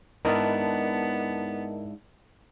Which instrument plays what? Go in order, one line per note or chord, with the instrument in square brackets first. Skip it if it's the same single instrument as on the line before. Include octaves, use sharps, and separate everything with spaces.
[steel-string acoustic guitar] G#2 D4 E4 [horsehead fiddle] B3 [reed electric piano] A#4 D#5 A5